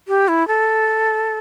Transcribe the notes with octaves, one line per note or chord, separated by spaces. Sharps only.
G4
E4
A4